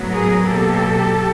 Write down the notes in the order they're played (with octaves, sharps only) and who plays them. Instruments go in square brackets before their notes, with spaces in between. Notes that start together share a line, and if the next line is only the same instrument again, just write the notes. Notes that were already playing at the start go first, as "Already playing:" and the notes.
Already playing: [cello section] A2 F#3 B3
G#4 A#4
B2 F#3 A#3 G4 A4